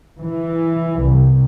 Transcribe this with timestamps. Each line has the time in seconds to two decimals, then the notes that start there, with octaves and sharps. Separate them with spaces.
0.21 E3
1.04 C2